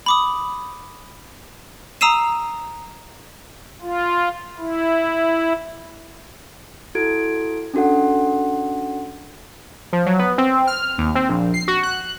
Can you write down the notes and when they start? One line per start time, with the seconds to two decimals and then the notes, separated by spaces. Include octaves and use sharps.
0.06 B5 D6 D#6
2.01 A#5 D#6 E6 C7 D#7 E7
3.82 F4
4.59 E4
6.95 E4 F#4 A4 G#6 D7
7.74 C#4 D4 F#4 A4 F#5
9.93 F3
10.06 F#3
10.19 B3
10.38 C4
10.67 F6
10.98 D#2
11.15 C4
11.29 A#1
11.54 C7
11.68 F#4
11.83 F#6